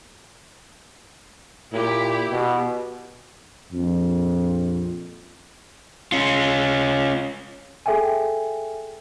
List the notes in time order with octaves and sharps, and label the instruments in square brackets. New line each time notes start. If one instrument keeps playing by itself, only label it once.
[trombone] A#2 [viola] E4 G4
[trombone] B2
[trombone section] A#1 F2
[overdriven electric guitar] C#4 F4
[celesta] G#4 A4 E5 G5 G#5